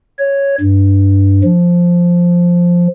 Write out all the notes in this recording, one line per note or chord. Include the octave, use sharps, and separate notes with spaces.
C#5
G2
F3